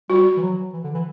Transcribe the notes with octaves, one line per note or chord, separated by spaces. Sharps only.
G3 F#4
E3
F#3
E3
D3
E3